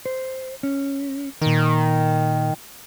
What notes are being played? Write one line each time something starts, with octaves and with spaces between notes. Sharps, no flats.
C5
C#4
A#2 D#3 A#4